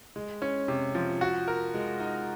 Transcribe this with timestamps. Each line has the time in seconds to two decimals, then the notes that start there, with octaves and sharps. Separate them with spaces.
0.16 G#3
0.42 C#4
0.68 C3
0.95 F3
1.21 F#4
1.48 A#4
1.74 G#3
2.00 D#4